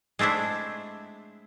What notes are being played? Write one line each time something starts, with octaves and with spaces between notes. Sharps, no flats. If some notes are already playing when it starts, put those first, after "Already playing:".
G#3 A3 C4 D4 E4